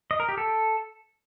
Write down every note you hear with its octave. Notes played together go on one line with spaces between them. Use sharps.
D#5
A#4
G4
A4